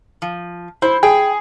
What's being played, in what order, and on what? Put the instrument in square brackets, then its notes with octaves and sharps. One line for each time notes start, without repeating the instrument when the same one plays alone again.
[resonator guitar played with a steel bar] F3
[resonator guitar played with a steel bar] E4 [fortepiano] C5
[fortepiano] G#4 [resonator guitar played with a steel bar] G5